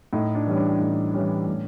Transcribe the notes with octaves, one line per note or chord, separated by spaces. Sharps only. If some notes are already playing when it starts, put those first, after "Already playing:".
A2 D#4
D4
E3 G3 C#4
D4
A2 D#4
E3 G3 C#4
A2